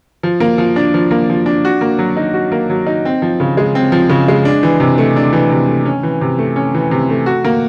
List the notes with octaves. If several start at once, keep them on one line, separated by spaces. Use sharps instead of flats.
F3
A#3
F3
D4
F3
A#3
F3
D4
F#4
A#3
F#3
D#4
F#4
A#3
F#3
D#4
C4
F3
C#3
G#3
C4
F3
C#3
G#3
D4
E3
C3
A3
D4
E3
C3
A3
C#4
E3
C3
A3
C#4
E3
C3
A3
F#4
A#3